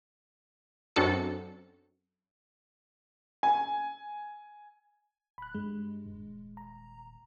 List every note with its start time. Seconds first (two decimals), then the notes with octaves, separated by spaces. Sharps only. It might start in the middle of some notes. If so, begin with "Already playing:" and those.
0.96 F#2 C4 D4 F#4 A4 C#7
3.43 G#5
5.38 D1 B5 F#6
5.55 G2 G#3
6.06 D#1
6.57 A#5